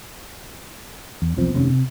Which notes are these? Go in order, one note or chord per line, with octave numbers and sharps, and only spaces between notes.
E2
B1 E2 F3 C4
F1 D#2 C3 C#4
C3